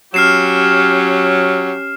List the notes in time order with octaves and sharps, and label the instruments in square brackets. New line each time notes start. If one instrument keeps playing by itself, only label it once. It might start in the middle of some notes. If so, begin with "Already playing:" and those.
[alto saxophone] F#3 [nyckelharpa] C#4 G4 [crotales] F6 C7 E7